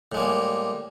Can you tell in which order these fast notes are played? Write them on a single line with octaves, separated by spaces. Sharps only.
A2 G#3 A#3 G3